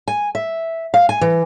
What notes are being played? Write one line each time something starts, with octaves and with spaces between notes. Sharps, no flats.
G#5
E5
F5
G#5
E3